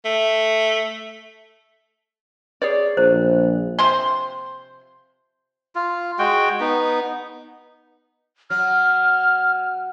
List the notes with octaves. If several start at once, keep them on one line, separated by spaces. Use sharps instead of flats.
A3
G#4 C#5 D5
A#1 C5
C3 F3 C5 C6
F4
G#3 F#4 G5
B3 D#4
F#3 F6